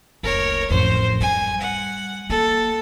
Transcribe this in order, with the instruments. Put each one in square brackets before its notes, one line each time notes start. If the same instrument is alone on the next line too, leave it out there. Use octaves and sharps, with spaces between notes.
[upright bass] F#1 D2 [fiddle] A#4 C#5
[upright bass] A1 F2 [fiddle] C5
[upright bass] G3 [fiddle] G#5
[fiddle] F#5
[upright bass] A#3 [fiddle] A4